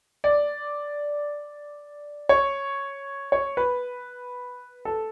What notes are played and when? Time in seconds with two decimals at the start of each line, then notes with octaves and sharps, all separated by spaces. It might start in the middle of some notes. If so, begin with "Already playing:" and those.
0.24 D5
2.29 C#5
3.32 C#5
3.57 B4
4.85 A4